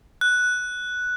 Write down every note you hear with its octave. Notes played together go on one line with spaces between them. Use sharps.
F#6